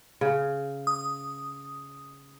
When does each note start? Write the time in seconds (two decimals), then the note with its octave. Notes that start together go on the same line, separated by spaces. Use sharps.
0.21 C#3
0.87 D#6